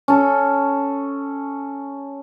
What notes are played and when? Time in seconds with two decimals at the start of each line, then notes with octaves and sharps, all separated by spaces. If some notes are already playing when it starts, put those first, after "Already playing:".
0.08 C#4 A4